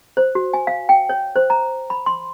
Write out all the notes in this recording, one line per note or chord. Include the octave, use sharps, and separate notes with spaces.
C5
F#4
G#5
F5
G5
C#5
C5
A#5
B5
C6